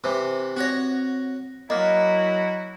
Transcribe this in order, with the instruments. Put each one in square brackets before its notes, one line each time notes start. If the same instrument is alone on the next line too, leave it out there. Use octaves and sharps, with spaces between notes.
[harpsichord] C3 E3
[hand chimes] C4 A#6 [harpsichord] F#4 C#5
[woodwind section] F#3 E4 F#4 [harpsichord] A#3 [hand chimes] D#5